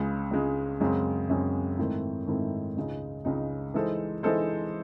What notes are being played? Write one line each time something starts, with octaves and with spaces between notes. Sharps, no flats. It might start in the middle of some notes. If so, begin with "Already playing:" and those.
Already playing: C#2 C#3 G#3
C#2 C#3 G#3
F#2 C#3 G#3 C4
F#2 C#3 G#3 C4
G#2 D#3 A3 C4 E4
G#2 D#3 A3 C4 E4
C#2 C#3 G#3 D#4
C#2 C#3 G#3 D#4
E3 G#3 D#4 A4 C5
E3 G#3 D#4 A4 C5